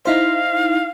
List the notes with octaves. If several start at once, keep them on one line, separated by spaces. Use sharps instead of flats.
D#4 E4 C5 F5